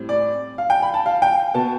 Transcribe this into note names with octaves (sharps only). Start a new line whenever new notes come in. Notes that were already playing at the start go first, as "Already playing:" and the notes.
Already playing: A2 G3 C4
D5
F5
G5
B5
A5
F5
G5
B2 B3 A5